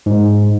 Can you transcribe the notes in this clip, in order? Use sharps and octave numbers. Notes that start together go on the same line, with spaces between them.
G#2